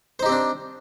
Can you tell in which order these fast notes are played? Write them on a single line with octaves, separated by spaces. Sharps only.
C5 D#4 G4 C4 D4